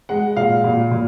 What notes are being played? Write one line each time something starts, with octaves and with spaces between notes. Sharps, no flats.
G#3 F#5
A#2 F5
A#2
A#2